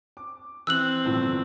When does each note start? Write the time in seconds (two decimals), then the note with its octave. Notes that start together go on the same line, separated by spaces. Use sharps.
0.17 D6
0.67 E3 C4 E6 F#6 F#7
1.05 G1 A2 F3